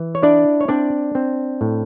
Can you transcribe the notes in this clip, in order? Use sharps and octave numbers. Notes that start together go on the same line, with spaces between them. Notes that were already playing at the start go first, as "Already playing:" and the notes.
Already playing: E3
C#5
D4 E4 D5
C#5
C4 D4 D5
C4
A2